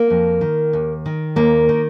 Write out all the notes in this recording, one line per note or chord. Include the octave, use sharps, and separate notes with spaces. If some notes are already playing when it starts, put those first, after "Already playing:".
Already playing: A#3
F2
D#3
D#2
D#3
D#2 A#3
D#3